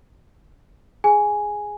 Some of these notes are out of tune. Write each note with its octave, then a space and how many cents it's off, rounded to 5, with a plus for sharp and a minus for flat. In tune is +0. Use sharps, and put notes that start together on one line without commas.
G#4 +0 G#5 +0